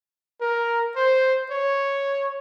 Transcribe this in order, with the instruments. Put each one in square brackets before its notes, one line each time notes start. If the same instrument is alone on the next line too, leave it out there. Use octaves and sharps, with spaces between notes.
[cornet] A#4
C5
C#5